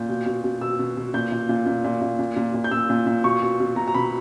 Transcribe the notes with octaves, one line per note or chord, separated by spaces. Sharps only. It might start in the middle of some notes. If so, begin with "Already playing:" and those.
Already playing: A#2 G6
B2
B2
B2
B2 E6
B2
B2
A#2 G6
A#2
A#2
A#2
A#2
A#2
A#2
A#2
A#2
G6
A#2 E6
A#2
A#2
B2 C#6
B2
B2
B2 A#5
A#5
B2 B5